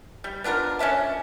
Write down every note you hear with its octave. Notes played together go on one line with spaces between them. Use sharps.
G3
B3 D4 F4 A#4
C#4 D4 E5 A5